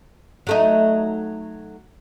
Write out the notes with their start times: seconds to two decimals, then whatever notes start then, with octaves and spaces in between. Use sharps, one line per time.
0.47 F#3 A3 D#4